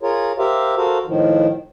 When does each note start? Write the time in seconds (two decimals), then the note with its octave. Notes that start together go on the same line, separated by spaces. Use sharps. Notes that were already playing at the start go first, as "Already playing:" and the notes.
0.03 F4 G#4 A#4 C#5
0.39 G4 A#4 C5 E5 F5
0.76 F#4 A4 A#4 C5 F5
1.06 A2 D#3 F3